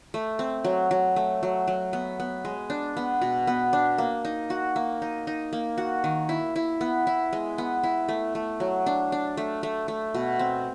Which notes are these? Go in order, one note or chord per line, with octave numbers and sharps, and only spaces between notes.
A3
C4
F#3
F#3
A3
F#3
F#3
B3
B3
G#3
D4
B3
B2
B3
D4
A#3
D#4
F#4
A#3
D#4
D#4
A#3
F#4
D#3
E4
E4
B3
E4
G#3
B3
E4
A3
A3
F#3
D4
D4
A3
A3
A3
B2
C4